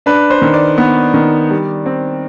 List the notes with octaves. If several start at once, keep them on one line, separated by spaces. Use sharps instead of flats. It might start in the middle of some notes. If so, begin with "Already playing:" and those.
D4 B4
C5
D#3
D5
B3
D#3
G3
C4